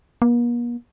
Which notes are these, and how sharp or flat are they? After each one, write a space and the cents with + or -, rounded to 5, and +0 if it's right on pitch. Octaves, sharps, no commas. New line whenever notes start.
A#3 +45